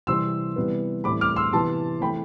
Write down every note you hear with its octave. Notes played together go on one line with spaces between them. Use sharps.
C3 E3 G3 C4 C6 E6
C3 E3 G3 B3
A2 E3 G3 C4 B5 D6
D6 F6
C6 E6
C3 E3 B3 A5 C6
E3 A3 C4 G5 B5